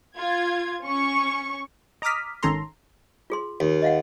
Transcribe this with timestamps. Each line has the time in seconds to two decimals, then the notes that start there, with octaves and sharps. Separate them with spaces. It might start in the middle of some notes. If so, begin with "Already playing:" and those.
0.17 F4 G#6
0.83 C#4 C#6
2.02 D#5 A#5 D6 D#6 F6 B6
2.43 G#1 D#3 C#4 A4 A#5 C6
3.30 F4 G#4 C6
3.60 D#2
3.82 D#5 F5 F#5